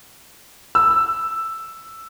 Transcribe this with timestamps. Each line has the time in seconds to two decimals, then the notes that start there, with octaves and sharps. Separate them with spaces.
0.75 E6